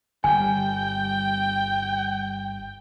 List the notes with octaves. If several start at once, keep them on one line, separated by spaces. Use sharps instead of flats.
G1 G3 G5 G#5